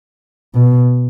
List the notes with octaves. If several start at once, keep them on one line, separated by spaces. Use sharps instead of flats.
B2